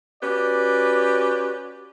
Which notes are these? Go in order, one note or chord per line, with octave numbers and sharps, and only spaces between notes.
C#4 F#4 G4 B4 D5